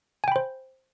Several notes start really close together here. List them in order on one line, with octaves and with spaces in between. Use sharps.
G#5 G5 B5 C5